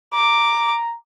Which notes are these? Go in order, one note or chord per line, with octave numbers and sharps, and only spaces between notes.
A#5 D6